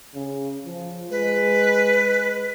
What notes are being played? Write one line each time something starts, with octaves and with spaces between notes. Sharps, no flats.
C#3
F3
G#3 B4